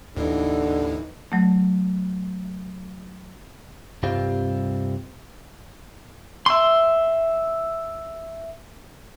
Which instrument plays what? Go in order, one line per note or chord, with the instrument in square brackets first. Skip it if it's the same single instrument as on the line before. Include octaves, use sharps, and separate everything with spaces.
[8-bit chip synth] D#2 A2 [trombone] D3 [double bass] E3 D#4
[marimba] F#3 A3
[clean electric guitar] C2 G2 C3 G3 C4 F4
[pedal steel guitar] E5 C6